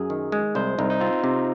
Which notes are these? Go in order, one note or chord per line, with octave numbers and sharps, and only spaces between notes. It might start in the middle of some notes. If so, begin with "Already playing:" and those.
Already playing: F#2 G#4
D#3
G#3
C2 C5
C2 D#4
D#4
C4 F4
C3